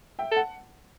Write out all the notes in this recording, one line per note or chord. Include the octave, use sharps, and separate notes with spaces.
E5 G5
A4
F#5 A5